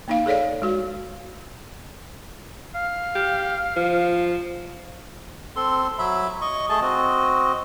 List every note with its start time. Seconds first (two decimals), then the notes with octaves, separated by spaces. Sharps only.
0.08 A#3 D#4 F5
0.26 G#4 A4 C#5 D5 F5
0.62 G#3 F#4
2.75 F5
3.15 G4
3.76 F3
5.56 C4 A4 C6
5.99 F#3 E5 B5
6.41 D#5 C#6
6.69 A3 G#4 D#5 A5
6.82 C4 F#4 D#5